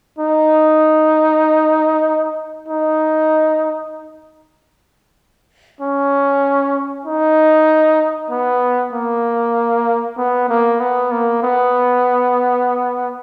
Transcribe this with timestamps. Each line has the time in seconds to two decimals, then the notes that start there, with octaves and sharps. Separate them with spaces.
0.18 D#4
2.68 D#4
5.81 C#4
7.06 D#4
8.31 B3
8.93 A#3
10.18 B3
10.49 A#3
10.80 B3
11.11 A#3
11.43 B3